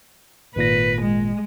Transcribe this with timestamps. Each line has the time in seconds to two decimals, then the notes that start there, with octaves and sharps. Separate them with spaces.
0.56 G#1 A#2 B4 A#6
1.02 G#3